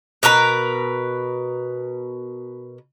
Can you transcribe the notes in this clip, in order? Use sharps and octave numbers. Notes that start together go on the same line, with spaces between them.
B2 A#4 B4 A#5